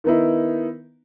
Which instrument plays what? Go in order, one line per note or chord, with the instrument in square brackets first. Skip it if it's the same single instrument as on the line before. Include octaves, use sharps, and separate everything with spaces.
[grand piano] D#3 B3 D#4 E4